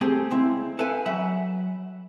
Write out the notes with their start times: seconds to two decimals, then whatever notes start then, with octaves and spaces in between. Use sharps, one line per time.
0.01 A3 C4 G4 G#4
0.31 C#2 C4 E4
0.79 A4 B4 E5 F5 G5 G#5
1.06 F#3 E5 F#5 B5